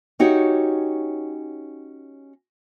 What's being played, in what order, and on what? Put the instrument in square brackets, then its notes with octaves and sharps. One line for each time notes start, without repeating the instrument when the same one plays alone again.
[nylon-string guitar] C#4 D#4 F#4 G4 C#5